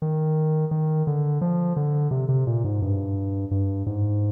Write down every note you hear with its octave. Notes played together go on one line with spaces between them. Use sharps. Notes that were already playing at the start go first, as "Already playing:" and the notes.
D#3
D#3
D3
F3
D3
C3
C3
A#2
G#2
G2
G2
G#2